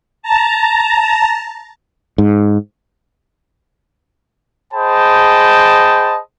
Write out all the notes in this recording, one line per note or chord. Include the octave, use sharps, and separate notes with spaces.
A5 A#5
G#2
G#4 C5 D#5 G5 A5 B5